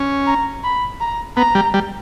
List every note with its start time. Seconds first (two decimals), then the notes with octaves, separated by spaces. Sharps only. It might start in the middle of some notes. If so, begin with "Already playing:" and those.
Already playing: C#4
0.27 A#5
0.64 B5
1.00 A#5
1.37 B3 A#5
1.55 G3
1.74 G3